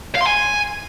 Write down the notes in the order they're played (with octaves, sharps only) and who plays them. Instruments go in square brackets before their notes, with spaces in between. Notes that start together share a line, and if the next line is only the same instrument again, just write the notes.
[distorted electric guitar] F5
C6
G#5